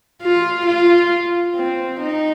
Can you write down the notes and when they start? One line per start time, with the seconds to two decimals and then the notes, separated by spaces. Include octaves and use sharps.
0.22 F4
0.66 F4
1.55 C4
1.99 D#4